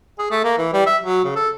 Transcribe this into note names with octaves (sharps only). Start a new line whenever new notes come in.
G#4
A3
A#3
E3
G3
E5
F#3
C#3
A4